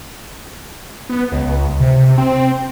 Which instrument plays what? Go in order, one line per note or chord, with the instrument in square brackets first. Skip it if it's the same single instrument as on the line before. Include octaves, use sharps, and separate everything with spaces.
[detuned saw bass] B3
C#2
C3
C4